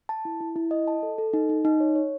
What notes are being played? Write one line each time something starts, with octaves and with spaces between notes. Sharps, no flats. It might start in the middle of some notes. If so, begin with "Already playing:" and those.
A5
E4
E4
E4
D#5
A5
A4
A4
D#4
D#4
D#4
C#5
C#5